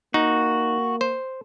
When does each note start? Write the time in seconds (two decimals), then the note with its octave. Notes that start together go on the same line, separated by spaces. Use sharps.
0.14 A#3 D#4 F#4
1.01 C5